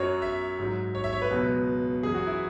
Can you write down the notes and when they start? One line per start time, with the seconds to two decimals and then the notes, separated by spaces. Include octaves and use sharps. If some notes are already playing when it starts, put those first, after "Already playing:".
Already playing: F#2 F#3 C#5
0.22 E5
0.59 G#2 F#3
0.95 C#5
1.04 E5
1.13 C#5
1.22 B4
1.30 C#2 B2 F#3
2.03 F#2 E3 G#4
2.15 F#4
2.27 E4